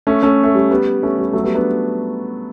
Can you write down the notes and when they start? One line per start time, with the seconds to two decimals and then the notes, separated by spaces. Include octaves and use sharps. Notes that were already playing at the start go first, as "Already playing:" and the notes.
0.07 A3 C#4
0.23 A3 C#4
0.43 A3
0.54 G3
0.71 G3 B3
1.03 A3 C#4
1.18 G3
1.33 F#3 A3
1.44 G3 B3
1.55 B3 D4